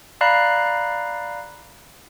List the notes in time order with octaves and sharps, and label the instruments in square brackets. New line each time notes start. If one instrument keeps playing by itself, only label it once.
[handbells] D5 F5 A#5 B5 F#6 C7